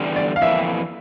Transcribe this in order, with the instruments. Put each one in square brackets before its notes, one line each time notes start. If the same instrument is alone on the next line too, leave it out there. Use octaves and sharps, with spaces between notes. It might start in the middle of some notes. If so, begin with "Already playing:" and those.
Already playing: [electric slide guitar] E2 D3 G3
[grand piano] D5
F5
[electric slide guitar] F2 E3 A#3 [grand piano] E5